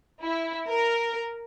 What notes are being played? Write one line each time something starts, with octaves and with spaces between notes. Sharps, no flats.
E4
A#4